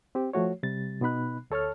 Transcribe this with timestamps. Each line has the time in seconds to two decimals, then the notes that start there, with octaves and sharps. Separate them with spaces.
0.15 C4 G4
0.33 F3 A3 F#4 C#5
0.63 C3 G3 A6
1.01 B2 B3 D#4 B5 F#6
1.50 D2 A4 C#5 A5 F6